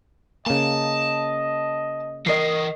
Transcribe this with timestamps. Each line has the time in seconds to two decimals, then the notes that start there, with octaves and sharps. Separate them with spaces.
0.47 C#3 A#3 D#5 A5
2.27 E3 A#4 D#5 C7